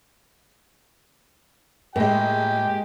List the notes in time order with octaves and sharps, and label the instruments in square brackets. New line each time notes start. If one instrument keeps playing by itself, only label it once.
[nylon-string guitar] A2 [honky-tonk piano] G#3 A#3 [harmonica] G4 G5 G#5